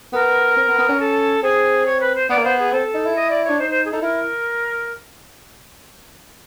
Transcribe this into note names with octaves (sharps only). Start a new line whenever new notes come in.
B3 A#4
C4
B3
B3
C#4
A4
C4 G#4
C#5
B4
C5
B3 D5
A#3
B3 C5
G#4
C4 A4
D#4
E4
D#5
D5
D4 C#5
D#4 C5
C5
G#4
D#4 A4
E4 A#4